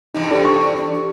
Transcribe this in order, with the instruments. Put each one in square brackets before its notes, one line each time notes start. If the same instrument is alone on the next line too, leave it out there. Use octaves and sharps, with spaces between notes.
[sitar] E2 G2 C3 [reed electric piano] D#4
[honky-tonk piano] D4 [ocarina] G4 [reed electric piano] A4 C5
[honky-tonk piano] C#6
[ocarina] D5
D4
G4